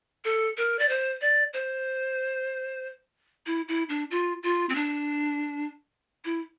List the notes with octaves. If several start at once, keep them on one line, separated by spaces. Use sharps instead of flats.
A4
A#4
D5
C5
D5
C5
E4
E4
D4
F4
F4
C4
D4
E4